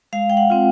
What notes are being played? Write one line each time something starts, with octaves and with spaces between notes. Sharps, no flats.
G#3 F5
G5
F#5
C4 F4